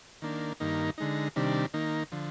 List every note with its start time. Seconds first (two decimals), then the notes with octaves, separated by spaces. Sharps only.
0.22 D#3 A#3 D4
0.60 G2 D#3 A#3 D#4
0.98 D3 G#3 D#4
1.36 C3 D#3 G3 D4
1.74 D#3 A#3 D#4
2.12 D3 F3